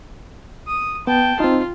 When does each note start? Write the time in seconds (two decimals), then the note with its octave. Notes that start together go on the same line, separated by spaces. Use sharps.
0.68 D#6
1.07 B3 G5 A5
1.40 C4 D#4 F4